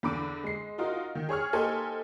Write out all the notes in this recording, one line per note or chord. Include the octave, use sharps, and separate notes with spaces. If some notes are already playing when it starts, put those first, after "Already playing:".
E2 D3 B5 D6 D7
G#3 C7
D#4 F4 F#4 A#4 D#5
D#3
G#4 C#5 C#6 F6
A#3 D#4 G4 A4 C5 G#5